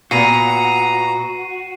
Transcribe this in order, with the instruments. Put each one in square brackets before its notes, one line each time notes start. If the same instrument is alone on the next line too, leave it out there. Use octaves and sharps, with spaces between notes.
[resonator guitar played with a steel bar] A#2 B3 [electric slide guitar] F#4 [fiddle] A#5 [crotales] C7 D#7